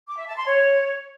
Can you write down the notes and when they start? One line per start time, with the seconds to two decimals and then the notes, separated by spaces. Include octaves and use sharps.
0.08 D6
0.17 E5
0.27 A5
0.36 C6
0.46 C#5